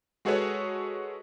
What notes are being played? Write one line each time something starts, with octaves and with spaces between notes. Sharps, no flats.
G#3 F#4 G#4 A4 B4 C#5